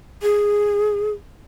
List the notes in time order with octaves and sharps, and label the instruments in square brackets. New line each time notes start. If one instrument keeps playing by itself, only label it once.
[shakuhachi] G#4